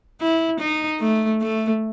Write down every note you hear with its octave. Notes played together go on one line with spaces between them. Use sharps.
E4
D#4
A3
A3